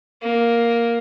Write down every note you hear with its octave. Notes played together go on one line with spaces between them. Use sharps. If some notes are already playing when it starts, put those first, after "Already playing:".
A#3